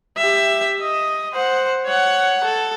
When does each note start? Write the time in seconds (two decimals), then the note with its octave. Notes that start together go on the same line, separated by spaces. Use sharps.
0.17 G4 E5
0.81 D#5
1.33 C5 F#5
1.86 C#5 F#5
2.44 A4